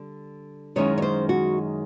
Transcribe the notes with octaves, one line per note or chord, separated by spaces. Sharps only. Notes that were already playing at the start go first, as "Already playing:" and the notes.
Already playing: D3 G3
F#2 D#3 G#3 C#4 E4 C#5
C#5
C5
F#4